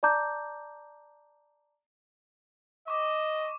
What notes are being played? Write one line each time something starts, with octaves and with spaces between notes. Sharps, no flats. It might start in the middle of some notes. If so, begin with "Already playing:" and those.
D5 A5 A#5 D6 G6
D#5 C#6 D6